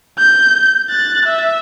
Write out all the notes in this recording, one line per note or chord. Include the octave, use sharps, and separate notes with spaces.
G6
F#6 A6
E5